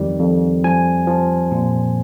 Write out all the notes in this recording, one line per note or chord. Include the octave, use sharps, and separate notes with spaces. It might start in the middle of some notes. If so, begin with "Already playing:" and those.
Already playing: F2 D#3 G3
F2
F3 G#5
F3
A#2